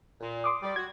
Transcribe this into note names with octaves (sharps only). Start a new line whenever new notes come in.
A#2
C6 D6 D#6
G3 D5
F#4 G#6